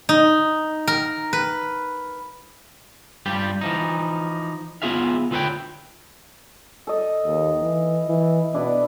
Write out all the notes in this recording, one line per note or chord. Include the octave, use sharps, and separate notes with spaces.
D#4
A#4
B4
G2 G3 F4 G4
E3 F3 D#4
B3 E4 F4 G#4 E5 F5
D2 F4 A4 B4 C#5 G5
A4 D#5
D#2
E3
E3
B2 D4 E4 B4